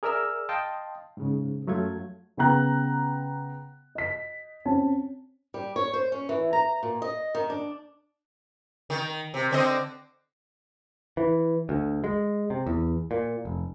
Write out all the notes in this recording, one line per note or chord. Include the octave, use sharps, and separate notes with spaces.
G#4 A#4 D5 E5 E6 F6
D#5 F5 G5 A5 C6
G#2 C#3
F#2 F#3 A3 F4 G#6
C#3 B3 G5 A#5 F#6
D#5 B6
C4 C#4 A5
G3
C#5
C5
C#4
E3
A#5
A#2
D#5
D#3
D4
D#3
C3
D3 C4 D#5
E3
D2
G#3
C3
E2
A#2
F1